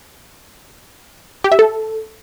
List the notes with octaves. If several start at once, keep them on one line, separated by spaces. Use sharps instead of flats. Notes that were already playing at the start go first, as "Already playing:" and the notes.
G4
E5
A4